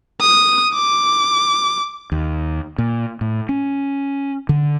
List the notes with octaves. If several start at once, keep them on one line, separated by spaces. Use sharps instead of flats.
D#6
D6
D#2
A#2
A2
C#4
D3